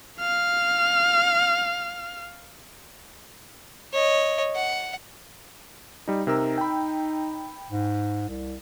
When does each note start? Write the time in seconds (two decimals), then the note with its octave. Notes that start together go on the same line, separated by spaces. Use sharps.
0.20 F5 F6
3.93 C#5 D#5
4.55 F#5
6.08 G3 D#4
6.27 C3 D#4 A#4 E6
6.58 G5 B5
7.70 G#2
8.28 C2